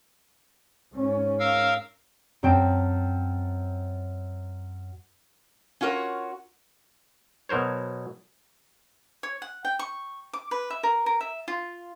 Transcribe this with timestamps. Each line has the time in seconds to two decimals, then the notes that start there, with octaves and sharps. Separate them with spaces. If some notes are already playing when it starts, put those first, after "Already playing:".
0.94 G#2 C#4
1.40 A#4 F5 E6
2.43 F#2 F#3 C4 G5 A5
5.81 C#4 F4 F#4 A#4 C#5
7.49 B2 F#3 A#4 C5 C#5
9.23 C#5
9.42 F#5
9.65 G5
9.79 C#6
10.33 D6
10.51 B4
10.70 E5
10.83 A#4
11.06 A#4
11.21 E5
11.48 F4